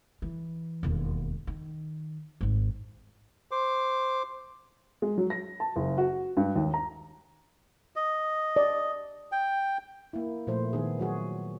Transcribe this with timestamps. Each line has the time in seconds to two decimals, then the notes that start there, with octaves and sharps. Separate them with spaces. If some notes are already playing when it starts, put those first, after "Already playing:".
0.22 E3
0.83 E1 D#2
1.47 D#3
2.41 G#1 G#2
3.51 C5 D6
5.02 G#3
5.18 F#3
5.30 A#6
5.60 A5
5.76 F#1
5.98 F#4
6.37 G2
6.56 D#2
6.74 A#5
7.96 D#5
8.56 D5
9.32 G5
10.13 A#3 E4
10.47 A#2 F3 A3 C5
10.73 D#3 B3 G#4
10.99 F#3 F#4 G#4